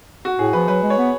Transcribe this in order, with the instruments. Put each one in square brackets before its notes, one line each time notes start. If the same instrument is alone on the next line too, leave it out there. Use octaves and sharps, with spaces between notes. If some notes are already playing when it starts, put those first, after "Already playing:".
[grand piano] F#4
[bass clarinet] A2 [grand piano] G#4
[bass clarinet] F3 [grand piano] B4
[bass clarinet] F#3 [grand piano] B4
[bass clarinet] G#3
[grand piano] C#5
[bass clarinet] B3